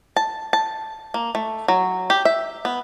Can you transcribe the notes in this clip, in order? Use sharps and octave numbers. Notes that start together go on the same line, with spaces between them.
A5
A5
A#3
A3
F#3
G4
E5
B3